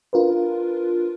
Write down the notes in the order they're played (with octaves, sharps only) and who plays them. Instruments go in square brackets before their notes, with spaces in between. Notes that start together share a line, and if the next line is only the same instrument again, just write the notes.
[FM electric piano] D4 F4 A#4 B4